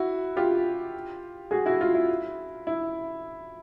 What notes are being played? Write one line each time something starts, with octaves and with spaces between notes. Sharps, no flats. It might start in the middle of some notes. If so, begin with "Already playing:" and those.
Already playing: E4 F#4
F4 G4
F#4 G#4
E4 F#4
F4
E4
E4